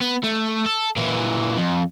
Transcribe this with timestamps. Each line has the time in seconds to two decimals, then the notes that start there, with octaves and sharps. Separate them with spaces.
0.01 B3
0.23 A3
0.66 A4
0.96 A#2 E3
1.57 F2